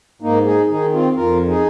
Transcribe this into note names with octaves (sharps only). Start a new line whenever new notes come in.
G#2 A#3 D#4
D#4 G#4
D#3 D#4 G#4
C4 F4
F2 F4 A#4
D#4 G#4